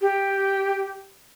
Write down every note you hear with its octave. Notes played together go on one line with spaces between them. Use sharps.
G4